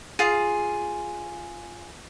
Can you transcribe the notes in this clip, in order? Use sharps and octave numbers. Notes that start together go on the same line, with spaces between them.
F4 G#4